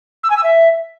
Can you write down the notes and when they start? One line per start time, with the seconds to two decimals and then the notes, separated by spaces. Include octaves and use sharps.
0.23 E6
0.30 G#5
0.36 E6
0.43 E5